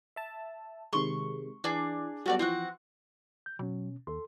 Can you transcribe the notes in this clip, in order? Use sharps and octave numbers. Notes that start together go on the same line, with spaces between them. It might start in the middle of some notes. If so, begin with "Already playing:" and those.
E5 A5
C3 D#3 G#3 C6 C#6
E3 D4 G#4
F#3 G3 A3 B3 F#4 D5
E3 F3 C4 F#4 F#5
G6
B2 F#3 C#4
D#2 A4 C6